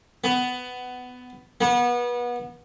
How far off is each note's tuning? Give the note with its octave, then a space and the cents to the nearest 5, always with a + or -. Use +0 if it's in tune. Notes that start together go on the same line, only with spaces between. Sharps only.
B3 +15
B3 -30